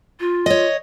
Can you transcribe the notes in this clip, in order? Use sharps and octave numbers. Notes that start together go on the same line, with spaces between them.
F4
C#5 D#5